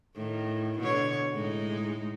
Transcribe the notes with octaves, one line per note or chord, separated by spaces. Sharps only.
A2 D#3
B2 D3 C#5
A2 G#3 D#4